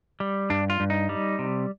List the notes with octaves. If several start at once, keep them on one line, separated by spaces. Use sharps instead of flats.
G3
G2 D4
F4
G2
D#4
G3
C3